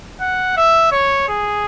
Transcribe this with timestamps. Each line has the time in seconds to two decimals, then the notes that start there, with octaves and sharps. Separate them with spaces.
0.20 F#5
0.57 E5
0.91 C#5
1.28 G#4